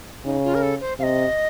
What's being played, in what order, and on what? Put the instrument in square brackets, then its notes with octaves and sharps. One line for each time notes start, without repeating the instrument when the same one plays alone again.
[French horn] C#3 [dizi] D#4
[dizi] F4
A#4
A4
C5
[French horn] C3 [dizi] F5
[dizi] D#5